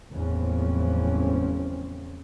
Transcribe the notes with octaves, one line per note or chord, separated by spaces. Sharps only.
F#1 E2 A2 F3 C4 C#4